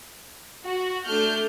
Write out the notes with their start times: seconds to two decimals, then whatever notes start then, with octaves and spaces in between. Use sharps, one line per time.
0.66 F#4
1.05 A3 D4 F6 G6